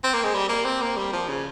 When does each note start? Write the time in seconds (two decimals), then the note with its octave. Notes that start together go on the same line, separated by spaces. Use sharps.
0.04 C4
0.13 A#3
0.23 G#3
0.34 G3
0.49 A#3
0.65 C4
0.81 A#3
0.96 G3
1.13 F3
1.28 C#3